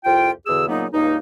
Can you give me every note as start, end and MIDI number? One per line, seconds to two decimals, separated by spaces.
0.05 0.30 36
0.05 0.30 41
0.05 0.30 65
0.05 0.30 79
0.46 0.66 40
0.46 0.66 47
0.46 0.66 50
0.46 0.66 68
0.46 0.66 88
0.68 0.86 46
0.68 0.86 49
0.68 0.86 54
0.68 0.86 58
0.68 0.86 59
0.68 0.86 63
0.93 1.17 37
0.93 1.17 43
0.93 1.17 58
0.93 1.17 63